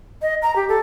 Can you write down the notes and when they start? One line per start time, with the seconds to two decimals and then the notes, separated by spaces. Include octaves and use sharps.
0.22 D#5
0.42 A#5
0.56 G4
0.69 A4